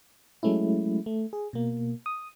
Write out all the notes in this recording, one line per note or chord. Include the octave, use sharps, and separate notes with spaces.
F#3 G#3 A3 C#4 E4
A3
G#4
B2 A#3
D#6